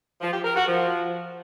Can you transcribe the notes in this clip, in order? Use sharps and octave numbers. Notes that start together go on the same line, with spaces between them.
F3
G4
A#4
F#4
F3